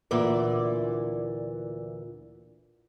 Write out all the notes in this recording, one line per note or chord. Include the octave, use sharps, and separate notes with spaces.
D2 A#2 E3 D5